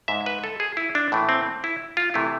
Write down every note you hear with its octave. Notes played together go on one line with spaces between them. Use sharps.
G#2 G#3 E5
B4
A4
G#4
E4
D4
A2 E3 A3
C4
E4
F4
C3 E3 A3 E4